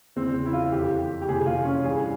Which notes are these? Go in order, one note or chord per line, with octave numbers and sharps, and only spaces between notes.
E2 C#3 E3 C4
E4
F4
F2 E3 G4
G4
F2 C3 E3 G#4
F4
C#4
G2 E3 G#4